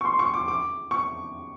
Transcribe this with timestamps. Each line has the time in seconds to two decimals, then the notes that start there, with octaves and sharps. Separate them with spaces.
0.01 C#6
0.05 C6
0.19 C#6
0.34 D6
0.48 D6
0.91 C#6